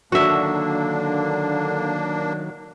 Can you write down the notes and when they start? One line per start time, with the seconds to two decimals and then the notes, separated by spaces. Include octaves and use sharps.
0.12 D3 D#3 F#3 A#3 D4 F#4 E5